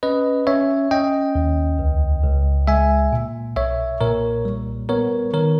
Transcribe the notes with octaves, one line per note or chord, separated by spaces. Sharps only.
C#4 B4 D#5
C#4 C#5 E5
C#4 D#5 G5
D#2
C#2
C#2
G#3 E5 G#5
A#2
B1 C#5 E5
A#2 A#4 C#5
G3
B3 A#4 C#5
D#3 A#4 C#5